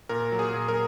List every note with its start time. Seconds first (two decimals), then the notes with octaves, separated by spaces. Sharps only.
0.09 A#2 A#4
0.32 F#3
0.39 G#4
0.54 A#2
0.68 A#4